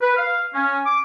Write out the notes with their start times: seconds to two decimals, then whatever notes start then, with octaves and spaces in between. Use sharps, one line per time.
0.01 B4
0.16 F5
0.54 C#4
0.86 D6